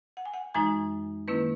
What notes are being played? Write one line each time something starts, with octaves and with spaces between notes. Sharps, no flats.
F#5
G#5
F#5
F#2 E3 G#3 D#4 G#5
D#3 A#3 C#4 E4 B4